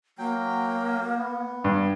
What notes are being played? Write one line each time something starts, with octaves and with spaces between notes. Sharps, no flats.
F#3 A#3 G5
B3
G2